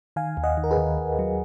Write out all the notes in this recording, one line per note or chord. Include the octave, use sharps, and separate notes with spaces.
D#3 F5 G#5
D#2
D#5 F#5
D#3
A#4
G#4 B4
D#2
D#2
F#3